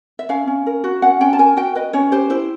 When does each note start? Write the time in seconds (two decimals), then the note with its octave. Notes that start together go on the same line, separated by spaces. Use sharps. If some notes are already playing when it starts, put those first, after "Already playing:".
0.19 E5
0.29 C#4 F5
0.47 C#4
0.66 A#4
0.84 F#4
1.02 C#4 F#5
1.21 C#4 G5
1.33 A5
1.39 A#4 G#5
1.57 F#4 G5
1.75 B4 D#5
1.93 C#4 C#5
2.12 G4 C5
2.30 E4 C5